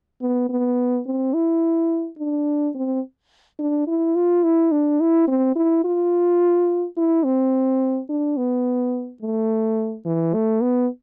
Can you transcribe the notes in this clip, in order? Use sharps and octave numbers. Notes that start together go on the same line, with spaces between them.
B3
B3
C4
E4
D4
C4
D4
E4
F4
E4
D4
E4
C4
E4
F4
E4
C4
D4
B3
A3
E3
A3
B3